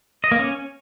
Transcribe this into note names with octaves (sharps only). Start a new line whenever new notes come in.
D#5
A#3
C#4